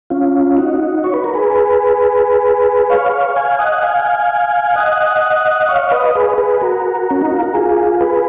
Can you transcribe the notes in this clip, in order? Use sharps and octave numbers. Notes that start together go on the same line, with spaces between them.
C#4 F4
D#4 F#4
C#5
B4
A#4
G#4 B4
C#5 F5
C#5 F5
F5 G#5
D#5 F#5
F5 G#5
D#5 F#5
C#5 F5
B4 D#5
G#4 B4
G#4 B4
F#4 A#4
C#4
D#4
F4
F#4
F4 G#4
G#4 B4